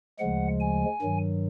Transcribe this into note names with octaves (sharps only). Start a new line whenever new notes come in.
D2 C#3 F3 G#3 F#5
G#5
G2 D#3 F#3